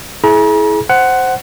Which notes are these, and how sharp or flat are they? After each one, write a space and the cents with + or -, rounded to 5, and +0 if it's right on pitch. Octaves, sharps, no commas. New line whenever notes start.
E4 -5 G#4 +35 A#5 +45
C5 +0 F#5 +10